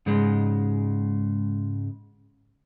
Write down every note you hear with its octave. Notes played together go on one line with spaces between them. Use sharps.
G#2 C#3 G#3